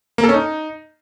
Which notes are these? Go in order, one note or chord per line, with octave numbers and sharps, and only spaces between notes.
A#3
A4
C#4
D#4